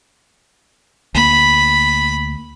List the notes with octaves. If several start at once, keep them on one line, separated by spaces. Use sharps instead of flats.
D2 A#3 B5